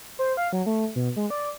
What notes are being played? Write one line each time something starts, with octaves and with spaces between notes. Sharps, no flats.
C5
F5
F#3
A3
B2
G#3
D5